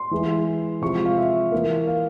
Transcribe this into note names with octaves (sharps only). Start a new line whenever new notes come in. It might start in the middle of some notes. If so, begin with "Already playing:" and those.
Already playing: C6
E3 G#3
C3 F3 G#3 C#6
F5
E5
E3 A#3
F5